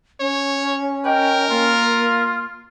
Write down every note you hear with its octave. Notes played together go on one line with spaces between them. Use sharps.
C#4 C#5
A#4 D#5 G5
A#3 F4